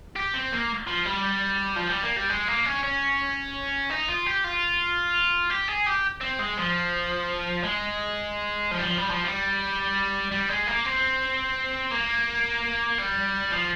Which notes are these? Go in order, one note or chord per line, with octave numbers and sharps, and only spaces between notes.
G4
C4
A#3
F3
G3
F3
G3
A#3
G3
G#3
A#3
C#4
C#4
D#4
F4
G4
F4
G4
G#4
G4
C4
G#3
F3
G#3
F3
G3
F3
G3
F3
G3
G3
G#3
A#3
C4
A#3
G3
F3